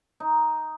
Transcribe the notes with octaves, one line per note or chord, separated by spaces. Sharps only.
D#4